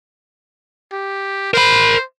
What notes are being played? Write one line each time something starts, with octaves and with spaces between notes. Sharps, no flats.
G4
A#4 C5 B5